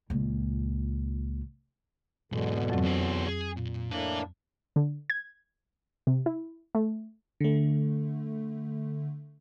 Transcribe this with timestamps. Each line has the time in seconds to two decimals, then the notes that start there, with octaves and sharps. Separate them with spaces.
0.10 C#2 A#2
2.32 B1 E2 G#2 B2 D3
2.70 F2 F#3 C4
2.85 C#4 C5
3.26 G#4
3.57 A#2
3.91 A2 A#3 D4 B4 E5
4.76 D3
5.10 G#6
6.07 C3
6.26 E4
6.75 A3
7.41 D3 A3